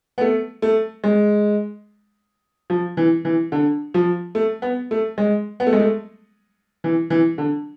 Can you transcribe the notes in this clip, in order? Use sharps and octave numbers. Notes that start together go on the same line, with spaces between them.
B3
A3
A3
G#3
F3
E3
E3
D3
F3
A3
B3
A3
G#3
B3
A3
G#3
A3
E3
E3
D3